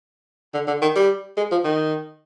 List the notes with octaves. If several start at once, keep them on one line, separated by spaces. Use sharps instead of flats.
D3
D3
D#3
G3
G#3
F3
D#3